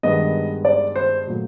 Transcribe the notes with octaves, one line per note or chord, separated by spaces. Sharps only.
G2 D#3 G#3 B3 D#5
D5
C5
A#2 F#3 A3